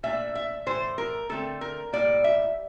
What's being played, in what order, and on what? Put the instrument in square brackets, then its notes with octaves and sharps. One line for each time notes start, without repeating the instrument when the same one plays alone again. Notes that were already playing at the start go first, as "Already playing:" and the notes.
[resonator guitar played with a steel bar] A#2 A3 D4 E5
E5
A2 E3 A3 C5
A#4
D3 A3 C4 A4
A#4
A2 G3 A#3 D5
E5